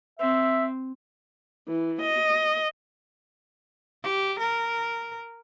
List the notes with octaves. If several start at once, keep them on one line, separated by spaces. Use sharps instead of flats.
C4 E5
E3
D#5
G4
A#4